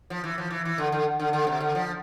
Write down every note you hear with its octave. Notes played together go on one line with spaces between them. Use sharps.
F3
E3
F3
E3
E3
D3
D3
D3
D3
C3
D3
F3